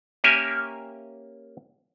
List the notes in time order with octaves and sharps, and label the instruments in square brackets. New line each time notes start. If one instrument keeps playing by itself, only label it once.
[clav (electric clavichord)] A#3 C#4 G4 A#4 E5 G#5